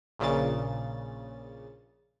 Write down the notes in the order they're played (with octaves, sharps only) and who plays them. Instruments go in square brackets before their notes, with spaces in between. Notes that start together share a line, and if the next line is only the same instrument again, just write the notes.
[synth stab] A#1 A#2 C#3 A6